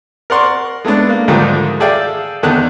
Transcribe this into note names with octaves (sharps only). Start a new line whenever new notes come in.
A#4 D5 F#5 C6 C#6
G#3 A3 B3 D4
A#3
D2 G#2 D3 D#3 F3 G3
G#4 A4 D5 E5 F5 G5
E2 D3 D#3 D#4 A5 F#6